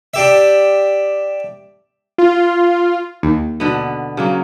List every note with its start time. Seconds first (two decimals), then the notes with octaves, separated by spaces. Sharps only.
0.14 D4 G4 E5
2.18 F4
3.23 D#2
3.60 B2 D3 B3
4.17 C#3 F#3 A#3